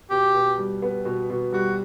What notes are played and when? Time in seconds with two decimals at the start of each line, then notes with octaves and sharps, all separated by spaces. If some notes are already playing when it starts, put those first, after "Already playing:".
0.10 B2 G4
0.34 B2
0.57 G3
0.82 B3
1.05 B2
1.30 B2
1.52 G3 F#4